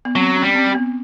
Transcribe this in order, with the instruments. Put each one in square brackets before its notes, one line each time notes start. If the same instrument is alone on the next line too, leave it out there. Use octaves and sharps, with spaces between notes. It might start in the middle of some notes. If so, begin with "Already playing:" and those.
[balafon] B3
[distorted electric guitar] F#3 [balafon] C4
[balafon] C#4
[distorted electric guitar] G3
[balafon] C4
B3